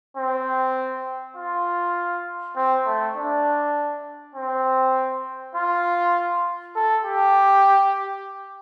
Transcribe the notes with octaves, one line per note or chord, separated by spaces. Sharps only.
C4
F4
C4
A3
D4
C4
F4
A4
G4